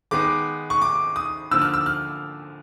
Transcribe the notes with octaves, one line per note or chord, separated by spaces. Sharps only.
D#3 G#3 B3 D6
C#6
D6
D#6
D3 F3 A#3 E6
F6
E6
F6